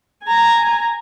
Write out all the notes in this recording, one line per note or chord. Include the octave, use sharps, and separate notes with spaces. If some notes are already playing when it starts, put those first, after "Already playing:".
G#5 A#5